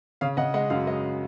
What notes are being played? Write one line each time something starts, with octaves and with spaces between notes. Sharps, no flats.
C#3 F5
C#3 D#5 F#5
G#3 D#5 F#5
F#2 F5
G#3 D#5